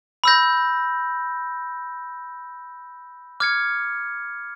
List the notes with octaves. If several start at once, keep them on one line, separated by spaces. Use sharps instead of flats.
B5 E6 G6 A#6
D6 F6 G#6 C#7